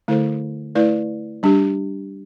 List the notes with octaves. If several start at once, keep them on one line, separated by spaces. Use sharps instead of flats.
D3 A3 E4 A4 C5
A3 E4 B4 D5
G3 D4 G4